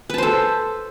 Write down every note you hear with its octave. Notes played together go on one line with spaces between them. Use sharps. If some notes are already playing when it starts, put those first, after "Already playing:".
A4 B4 C5 A5